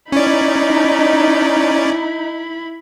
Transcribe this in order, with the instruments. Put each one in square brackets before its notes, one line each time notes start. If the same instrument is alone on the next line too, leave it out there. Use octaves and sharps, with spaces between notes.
[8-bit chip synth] C#4 D5 [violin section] D#4 [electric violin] E4 B5